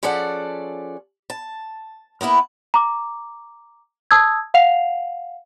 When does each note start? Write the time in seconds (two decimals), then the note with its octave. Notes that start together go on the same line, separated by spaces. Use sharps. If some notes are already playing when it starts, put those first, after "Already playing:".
0.03 F3 C#4 G#4 A4 D5 F#5
1.30 A5
2.21 A#3 B3 E4 B4
2.74 A#5 D6
4.11 A5 D#6 E6 G#6
4.54 F5 F#5 C7 F7